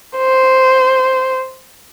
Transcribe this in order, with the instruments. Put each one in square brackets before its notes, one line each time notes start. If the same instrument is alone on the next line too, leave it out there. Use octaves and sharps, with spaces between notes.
[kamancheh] C5